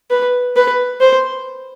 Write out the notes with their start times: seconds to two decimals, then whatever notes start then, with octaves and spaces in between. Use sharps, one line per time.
0.10 B4
0.56 B4
1.01 C5